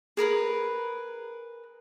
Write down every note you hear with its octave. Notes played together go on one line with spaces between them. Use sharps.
G#4 A#4 B4 B5